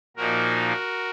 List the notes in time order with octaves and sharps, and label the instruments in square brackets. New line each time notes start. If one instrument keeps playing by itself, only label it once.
[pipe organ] A#2 F3 A#3 D#4 F#4 A#4